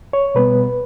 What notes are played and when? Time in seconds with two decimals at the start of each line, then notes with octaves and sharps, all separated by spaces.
0.13 C#5
0.35 B2 G3 B3 B4